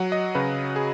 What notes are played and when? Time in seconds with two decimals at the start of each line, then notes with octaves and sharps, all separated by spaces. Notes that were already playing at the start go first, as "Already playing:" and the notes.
Already playing: F#3 F#5
0.12 D#5
0.35 C#3 B4
0.76 G#4